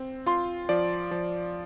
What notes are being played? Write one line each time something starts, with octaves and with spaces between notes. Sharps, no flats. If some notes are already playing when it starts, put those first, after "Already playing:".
Already playing: C4
F4 C6
F3 D5
F3